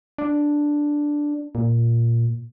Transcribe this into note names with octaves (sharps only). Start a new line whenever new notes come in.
D4
A#2